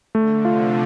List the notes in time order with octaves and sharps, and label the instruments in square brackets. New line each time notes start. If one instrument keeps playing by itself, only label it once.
[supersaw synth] D3 [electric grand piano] A3
[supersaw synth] C3 F3 [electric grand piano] F4